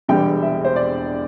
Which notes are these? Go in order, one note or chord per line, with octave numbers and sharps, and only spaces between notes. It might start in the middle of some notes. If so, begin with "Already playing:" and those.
E1 E2 D3 G3 G5
E5
C5
D5